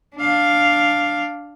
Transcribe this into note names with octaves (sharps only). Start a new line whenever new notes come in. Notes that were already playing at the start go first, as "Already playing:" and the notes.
D4 F5